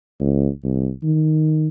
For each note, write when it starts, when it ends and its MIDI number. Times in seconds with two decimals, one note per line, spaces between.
0.20 0.49 37
0.64 0.90 36
1.03 1.68 51